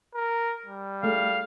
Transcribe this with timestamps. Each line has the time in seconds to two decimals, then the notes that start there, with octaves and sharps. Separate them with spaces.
0.15 A#4
0.66 G3
1.03 G#3 A3 F5